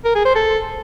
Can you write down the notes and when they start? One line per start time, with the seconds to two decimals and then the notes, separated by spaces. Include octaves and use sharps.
0.05 A#4
0.15 G#4
0.25 C5
0.35 A4